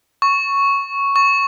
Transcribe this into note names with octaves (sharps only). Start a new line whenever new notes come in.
C#6
C#6